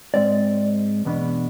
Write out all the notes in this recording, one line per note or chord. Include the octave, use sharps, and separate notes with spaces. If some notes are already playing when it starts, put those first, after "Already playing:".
G#2 G#3 C4 D5
E2 B2 B3 D4